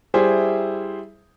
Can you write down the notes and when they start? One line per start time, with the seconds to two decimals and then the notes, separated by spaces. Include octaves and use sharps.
0.14 G3 E4 G#4 C5 E5